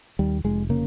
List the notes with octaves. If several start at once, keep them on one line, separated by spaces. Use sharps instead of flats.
D#2 G3
F1 G#3
C#3 A#3